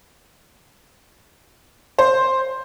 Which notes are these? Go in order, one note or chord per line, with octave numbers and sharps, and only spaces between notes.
C5